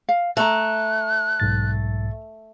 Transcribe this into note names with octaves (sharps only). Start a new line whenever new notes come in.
F5
A3 A5 A#5 F#6
B1 G#2 A6